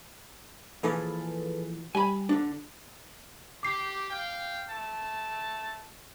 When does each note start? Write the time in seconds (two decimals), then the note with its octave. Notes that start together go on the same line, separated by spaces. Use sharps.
0.83 A#2 E3 F3 G#4 A4 B4
1.95 G3 G#5 B5
2.29 D3 D4
3.63 G4 D6 C7
4.10 F5 G5
4.69 A3 A5